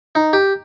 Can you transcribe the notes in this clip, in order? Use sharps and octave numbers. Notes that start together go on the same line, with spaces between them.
D#4
G4